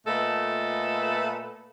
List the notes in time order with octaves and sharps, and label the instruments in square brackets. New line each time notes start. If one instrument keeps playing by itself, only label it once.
[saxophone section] A#2 A3 F4 A4 B4 D#5